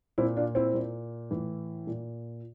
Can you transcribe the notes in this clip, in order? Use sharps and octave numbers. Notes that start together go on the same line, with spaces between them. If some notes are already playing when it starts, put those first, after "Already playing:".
A#2 C4 E4
D4 F4
C4 E4
A#2
A2 E3
A#2